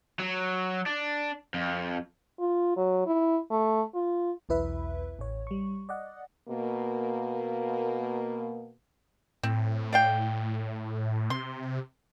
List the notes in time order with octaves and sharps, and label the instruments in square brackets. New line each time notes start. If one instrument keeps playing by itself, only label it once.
[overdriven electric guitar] F#3
D4
F2
[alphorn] F4
F#3
E4
A3
F4
[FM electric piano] B1 E2 E4 B4 E5
A1 C#5
G3 C#6
D5 D#5 F#5
[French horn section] B2 A#3
[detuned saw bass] A2 [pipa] C4
[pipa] D5 F5 G5
[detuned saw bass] C3 [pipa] C6